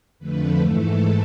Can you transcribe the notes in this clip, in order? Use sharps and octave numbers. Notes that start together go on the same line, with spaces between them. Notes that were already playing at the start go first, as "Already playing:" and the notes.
F2 D3 F3 A3 B4
G#2 E3 A3 A4